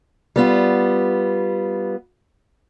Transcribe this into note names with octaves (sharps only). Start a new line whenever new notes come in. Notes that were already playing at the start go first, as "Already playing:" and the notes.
G3 B3 F4